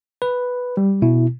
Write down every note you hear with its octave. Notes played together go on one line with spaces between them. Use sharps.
B4
G3
B2 E4